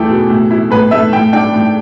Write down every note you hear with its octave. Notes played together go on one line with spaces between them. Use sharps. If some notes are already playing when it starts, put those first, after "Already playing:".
Already playing: E2 A3 E4 A4 G5
B2
A2
E4
A2 B4
A3 E5
A2 G5
D4 G5
A2